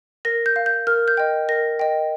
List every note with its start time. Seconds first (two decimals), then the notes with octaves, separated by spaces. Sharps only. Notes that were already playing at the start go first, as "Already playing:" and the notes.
0.25 A#4 A#6
0.46 G6
0.56 F5
0.66 G6
0.87 A#4 F6
1.08 G6
1.17 D#5 G5
1.49 A#4 A#6
1.79 D#5 G5